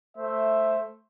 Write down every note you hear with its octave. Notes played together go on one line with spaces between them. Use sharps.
A3 C5 E5